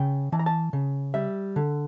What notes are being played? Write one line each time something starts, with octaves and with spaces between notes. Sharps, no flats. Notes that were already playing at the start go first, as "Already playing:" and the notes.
Already playing: C#3 G5
E3 A5
A#5
A5
C#3
G3 E5
D3